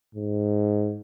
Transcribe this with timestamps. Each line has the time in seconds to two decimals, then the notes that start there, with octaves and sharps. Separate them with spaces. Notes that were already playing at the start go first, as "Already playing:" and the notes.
0.15 G#2